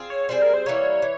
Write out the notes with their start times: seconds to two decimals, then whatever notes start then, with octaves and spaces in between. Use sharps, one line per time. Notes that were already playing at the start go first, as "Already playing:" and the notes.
Already playing: C4 F4 G#4
0.10 C#5
0.29 G3 C4 F4 G#4 C5
0.42 A#4
0.54 C5
0.66 E3 G3 A#3 C#5
1.02 E3